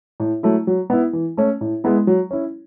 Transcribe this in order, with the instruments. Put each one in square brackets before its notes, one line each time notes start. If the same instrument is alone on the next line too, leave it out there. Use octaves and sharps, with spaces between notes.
[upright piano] A2
F#3 A3 E4
F#3
B3 E4
E3
A3 C#4
A2
G#3 B3 E4
F#3
C#4 E4